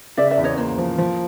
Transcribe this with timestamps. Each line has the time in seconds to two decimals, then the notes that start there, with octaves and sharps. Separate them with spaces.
0.17 C#3 D5 E5
0.31 D5 E5
0.38 E2
0.44 C#5 D#5
0.57 A#3 C5
0.78 F3
0.98 F3